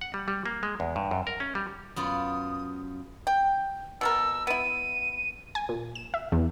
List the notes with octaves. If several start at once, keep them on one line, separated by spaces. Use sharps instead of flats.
F#5
G3
G3
A#3
G#3
E2
G2
F#2
A#4
C#4
G3
F#2 B3 F4 D#6
G5
B2 A4 A#4 E6
B3 E4 D#7
G#5
A#2
E7
E5
E2